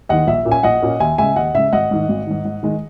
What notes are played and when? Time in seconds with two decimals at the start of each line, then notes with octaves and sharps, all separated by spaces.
0.09 D#2 D#3 D#5 F#5
0.27 A#1 E5
0.45 A#2 A#3 C#4
0.52 G#5
0.63 A#1 D#5 F#5
0.82 A#2 A#3 C#4
1.00 D#2 E5 G#5
1.18 C#3 G#3 E5 G#5
1.36 D#2 D#5 F#5
1.55 C#3 G#3 E5
1.72 G#1 D#5 F#5
1.91 G#2 D#3
2.09 G#1
2.27 G#2 D#3
2.45 G#2
2.63 D#3 G#3